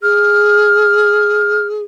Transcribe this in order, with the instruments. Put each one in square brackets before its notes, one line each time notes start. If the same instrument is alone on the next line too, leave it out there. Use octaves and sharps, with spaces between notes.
[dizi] G#4 [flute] F6